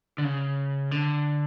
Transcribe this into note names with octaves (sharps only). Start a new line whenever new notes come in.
D3
C#3
D3